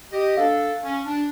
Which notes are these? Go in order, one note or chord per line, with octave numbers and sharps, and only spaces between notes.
G4 D#5
D4 A4 F5
C#4
D4